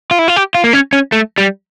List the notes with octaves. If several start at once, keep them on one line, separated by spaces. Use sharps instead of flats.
F4
E4
F4
G4
F4
A#3
C#4
C#4
A3
G3